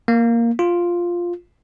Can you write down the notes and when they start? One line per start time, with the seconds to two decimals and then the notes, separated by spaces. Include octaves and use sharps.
0.08 A#3
0.59 F4